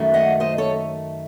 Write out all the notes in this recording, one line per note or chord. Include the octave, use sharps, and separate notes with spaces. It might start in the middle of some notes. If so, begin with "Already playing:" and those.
Already playing: F#2 D#3 A3
D#5 F#5
C5 D#5
A4 C#5